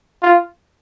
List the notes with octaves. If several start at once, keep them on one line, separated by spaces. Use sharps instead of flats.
F4